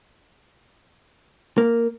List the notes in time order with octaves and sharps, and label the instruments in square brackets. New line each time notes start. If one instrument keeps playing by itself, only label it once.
[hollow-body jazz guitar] A#3